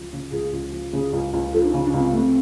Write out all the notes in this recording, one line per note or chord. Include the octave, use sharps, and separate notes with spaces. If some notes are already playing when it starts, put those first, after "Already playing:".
Already playing: C#2 F3
C#3
C#2 G#4
C#2
F3
C#3 G#4
C#2
C#2
F3 A4
D4
D#4
C#3
D4
C#2 C4
A3 C4